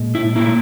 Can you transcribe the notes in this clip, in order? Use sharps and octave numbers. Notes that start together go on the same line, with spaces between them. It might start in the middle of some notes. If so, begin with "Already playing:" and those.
Already playing: A#2 G#3
E4
A#2 A#3 E4